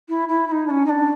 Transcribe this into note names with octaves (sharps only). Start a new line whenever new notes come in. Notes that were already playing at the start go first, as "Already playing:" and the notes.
E4
E4
E4
D#4
D4
C#4
D#4
D4